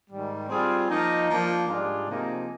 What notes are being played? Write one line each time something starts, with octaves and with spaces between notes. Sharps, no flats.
G#2 D#3 G3
G3 C4 F4 G#4
F3 A#3 D#4
F3 A#3 D4
G#2 G3 D4 F4 G#4
C3 F3 A#3 D#4 G#4